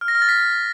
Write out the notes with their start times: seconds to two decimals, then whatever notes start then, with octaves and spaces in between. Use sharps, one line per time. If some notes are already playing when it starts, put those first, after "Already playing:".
0.01 F6
0.08 A#6
0.15 F6
0.22 A6
0.29 B6